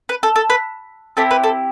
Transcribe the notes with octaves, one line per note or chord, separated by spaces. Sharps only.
B4
A4
A4
B4
C4 E4 G4 A4
B4
A4